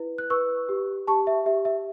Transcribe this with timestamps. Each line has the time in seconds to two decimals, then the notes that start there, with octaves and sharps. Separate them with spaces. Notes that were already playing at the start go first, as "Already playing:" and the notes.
Already playing: E4 B4
0.18 F#6
0.30 B4 C#6 E6
0.69 G4
1.07 G4 A5 C#6
1.27 E5
1.46 G4 E5
1.65 E5